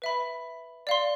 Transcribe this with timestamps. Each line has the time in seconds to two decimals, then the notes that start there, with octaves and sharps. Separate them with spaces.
0.02 B4 E5 B5
0.87 D5 F5 C6